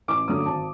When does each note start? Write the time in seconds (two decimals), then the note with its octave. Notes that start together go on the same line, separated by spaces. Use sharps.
0.08 A1 D6
0.28 G2 D3 F#3 A3 D#6
0.46 G#1 A5